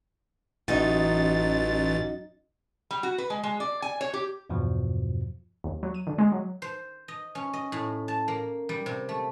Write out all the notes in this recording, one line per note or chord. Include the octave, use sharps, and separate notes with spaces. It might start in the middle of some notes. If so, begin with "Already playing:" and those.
A1 F#2 D#4 A6
G3
F#4
B4
G#3
G#3
D5
G#5
C#5
G4
E2 G2 B2 F3
D#2
F#3
D#7
D3
G#3
F#3
C5
D#5
C#4
D#5
A2
A5
A#3
G3
C3
A3